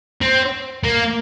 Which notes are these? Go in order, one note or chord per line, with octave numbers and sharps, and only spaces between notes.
C4
A#3